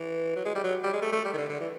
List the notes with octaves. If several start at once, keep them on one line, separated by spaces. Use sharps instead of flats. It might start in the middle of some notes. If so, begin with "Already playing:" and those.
Already playing: E3
F#3
G#3
G3
F#3
G3
G#3
A3
A3
G3
D#3
D3
D3
E3